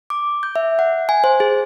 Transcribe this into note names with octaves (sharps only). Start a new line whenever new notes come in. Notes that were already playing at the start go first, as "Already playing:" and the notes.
D6
G6
E5
F#5
G#5
C5
G#4